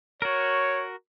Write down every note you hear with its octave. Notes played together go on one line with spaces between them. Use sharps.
F#4 A#4 C#5